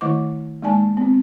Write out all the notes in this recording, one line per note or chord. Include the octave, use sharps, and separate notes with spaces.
D#3 A3 E4 D#5 C#6 D6
G#3 A#3 D#4 D5 G#5 A5
B3 C4